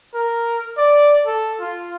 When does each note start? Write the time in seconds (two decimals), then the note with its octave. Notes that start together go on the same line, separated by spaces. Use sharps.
0.15 A#4
0.78 D5
1.27 A4
1.61 F4